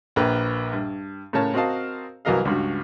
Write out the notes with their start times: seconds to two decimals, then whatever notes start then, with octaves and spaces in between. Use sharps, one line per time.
0.16 A#1 A#3 A#4 B4 G5
0.73 G2
1.33 A2 C#3 A#4 C#5 A5
1.54 C4 F#4 A#4 D#5 F5 A5
2.25 C2 E3 F#3 A#4 D#5 F5
2.45 C#2 G2 F#4